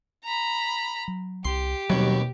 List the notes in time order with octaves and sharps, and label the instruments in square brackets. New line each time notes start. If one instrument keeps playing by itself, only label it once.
[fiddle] A#5 B5
[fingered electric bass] F#3
[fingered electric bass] C2 [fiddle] G4 [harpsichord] C6
[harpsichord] D#2 B2 [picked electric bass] F#3 [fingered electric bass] G3 C4